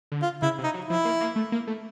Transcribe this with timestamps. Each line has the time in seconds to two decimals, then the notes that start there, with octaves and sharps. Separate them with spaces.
0.12 D3
0.22 F4
0.42 C#3 E4
0.58 C3
0.64 D#4
0.74 F#3
0.85 E4
0.90 F3
1.05 A#3
1.21 A#3
1.36 A3
1.52 A#3
1.67 A3